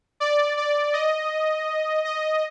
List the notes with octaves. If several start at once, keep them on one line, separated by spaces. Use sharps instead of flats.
D5
D5
D#5
D#5